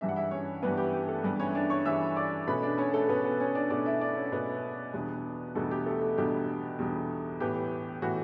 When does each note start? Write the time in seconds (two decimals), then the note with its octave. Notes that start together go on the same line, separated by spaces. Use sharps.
0.01 G2 E3 G3 D4 E5
0.09 F#5
0.16 E4 E5
0.31 C#4 C#5
0.62 G2 E3 G3 B3 D4 B4
0.77 G4
0.93 G4
1.08 A3 A4
1.24 G2 E3 G3 B3 D4 B4
1.39 C#4 C#5
1.55 D4 D5
1.70 C#5 C#6
1.85 G2 E3 G3 D4 E5 E6
2.16 D5 D6
2.47 B2 A3 C#4 B4 B5
2.62 D4 D5
2.78 C#4 C#5
2.94 A3 A4
3.09 B2 A3 B3 C#4 B4
3.24 B3 B4
3.40 C#4 C#5
3.55 D4 D5
3.70 B2 A3 C#4 D4 D5
3.86 E4 E5
4.01 D4 D5
4.16 C#4 C#5
4.32 B2 A3 B3 C#4 B4
4.94 E2 B2 G3 D4
5.55 E2 B2 G3 A3 D4 A4
5.71 G4
5.86 A3 A4
6.01 A3 A4
6.18 E2 B2 G3 D4 G4
6.78 E2 B2 G3 D4
7.40 A2 E3 B3 G4
8.02 A2 E3 B3 F#4